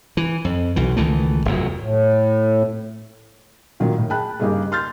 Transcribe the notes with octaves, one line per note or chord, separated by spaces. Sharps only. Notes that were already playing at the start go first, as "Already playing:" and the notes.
E3
F2
B1 E3
C#2 D#3 E3 A3
F1 E2 F#3
A2
A#2 D#3 F#3
A2
G#4 G5 A5 B5 F#6
G2 C#3 A#3 D#4 G4 G#4
C6 F6 G6 A6